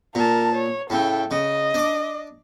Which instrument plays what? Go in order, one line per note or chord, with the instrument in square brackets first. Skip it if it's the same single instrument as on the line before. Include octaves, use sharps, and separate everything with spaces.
[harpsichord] A#2 [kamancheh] A#4 A5
[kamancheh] C#5
[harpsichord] A2 C#3 [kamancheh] A4 G5
[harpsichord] C#3 [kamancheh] D#5
[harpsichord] D4 D6